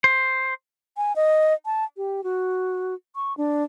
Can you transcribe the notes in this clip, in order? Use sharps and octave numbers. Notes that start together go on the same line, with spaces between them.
C5
G#5
D#5
A5
G4
F#4
C#6
D4